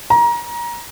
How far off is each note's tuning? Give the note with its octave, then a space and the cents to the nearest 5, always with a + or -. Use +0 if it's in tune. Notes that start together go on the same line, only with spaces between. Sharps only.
A#5 +25